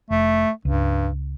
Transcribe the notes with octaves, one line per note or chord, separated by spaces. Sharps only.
F1 A3
C#2 G2